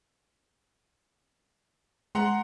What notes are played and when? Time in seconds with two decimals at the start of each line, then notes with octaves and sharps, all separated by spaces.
2.15 G#3 F#5 A#5 C6